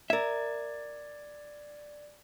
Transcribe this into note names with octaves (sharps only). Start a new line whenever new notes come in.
A#4 D5 E5 G#6